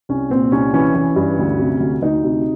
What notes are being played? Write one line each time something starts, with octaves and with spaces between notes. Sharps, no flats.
C2 C#4
A#2 C4
C2 C#4
E3 C#4
E3
G2
D2
C3
D2
D2 D#4
C3